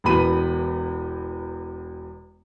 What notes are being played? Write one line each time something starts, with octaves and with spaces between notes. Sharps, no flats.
E1 E2 B3 B5 D#7